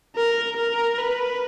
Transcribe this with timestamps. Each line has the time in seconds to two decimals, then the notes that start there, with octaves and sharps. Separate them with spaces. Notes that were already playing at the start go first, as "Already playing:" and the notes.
0.16 A#4
0.57 A#4
0.98 B4